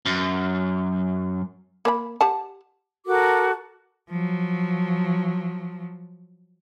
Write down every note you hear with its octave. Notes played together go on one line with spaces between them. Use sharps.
F#2
A#3 B4 B5
G4 F#5 A5
F#4 A4 A#4 D6
F3 F#3